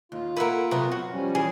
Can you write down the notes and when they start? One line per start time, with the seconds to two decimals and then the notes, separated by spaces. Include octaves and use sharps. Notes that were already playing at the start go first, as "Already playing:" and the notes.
0.12 D#2 F4
0.37 A#3 A#4 B4 E5 F#5
0.71 C3 F#3 B3 A#5
0.92 F#2 F#4
1.11 F3 G3 C#4
1.35 E3 G#4